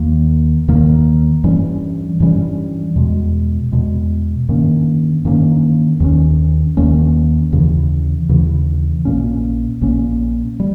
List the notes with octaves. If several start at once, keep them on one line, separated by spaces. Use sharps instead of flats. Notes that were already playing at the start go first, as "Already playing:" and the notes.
Already playing: D#2 D#3 A#3
D#2 D#3 A#3
G2 E3 G3 C#4
G2 E3 G3 C#4
E2 B2 G#3
E2 B2 G#3
G2 D#3 A#3 C#4
G2 D#3 A#3 C#4
D#2 D#3 A#3 C#4
D#2 D#3 A#3 C#4
D#2 C#3 E3
D#2 C#3 E3
A#1 A#2 A#3 C#4
A#1 A#2 A#3 C#4
G3